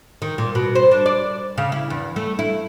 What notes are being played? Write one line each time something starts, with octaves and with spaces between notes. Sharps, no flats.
D#3
A#2
B2
C5
D4
D5
C#3
E4
E2
A3
E4